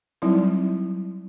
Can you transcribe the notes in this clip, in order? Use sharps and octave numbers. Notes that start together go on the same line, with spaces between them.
F#3 G3 C4 D#4 E4